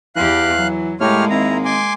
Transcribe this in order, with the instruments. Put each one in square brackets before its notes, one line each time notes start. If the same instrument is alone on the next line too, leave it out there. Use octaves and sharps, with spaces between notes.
[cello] E2 G4 [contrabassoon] E3 [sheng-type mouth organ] F5 F#6
[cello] F#3
[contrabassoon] A2 [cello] G#3 A#3 [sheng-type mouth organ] G4 C#5 F6
[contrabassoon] G#1 [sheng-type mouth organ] E4 A#5
[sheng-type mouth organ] G#5 C6 D6